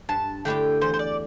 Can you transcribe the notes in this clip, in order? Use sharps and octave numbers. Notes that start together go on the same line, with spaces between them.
G2 A5
D3 A3 E4 G4 G5
E2 C5
C5
D5